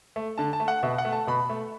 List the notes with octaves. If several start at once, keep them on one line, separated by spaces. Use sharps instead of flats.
A3
D3 A5
A5
A3
F#5
B2 E5
F#5
A3
A5
B2 B5
A3